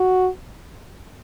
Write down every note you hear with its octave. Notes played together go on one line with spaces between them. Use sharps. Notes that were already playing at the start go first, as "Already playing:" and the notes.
Already playing: F#4